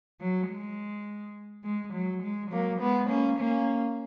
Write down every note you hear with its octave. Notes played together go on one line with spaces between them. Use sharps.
F#3
G#3
G#3
F#3
G#3
F#3 A#3
G#3 B3
A#3 C#4
A#3 C#4